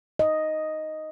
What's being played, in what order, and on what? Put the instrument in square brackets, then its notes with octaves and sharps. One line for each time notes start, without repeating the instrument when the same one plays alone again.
[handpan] D#5